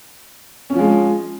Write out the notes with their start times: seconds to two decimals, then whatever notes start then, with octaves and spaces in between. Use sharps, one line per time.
0.70 C#4
0.74 F3
0.79 G#3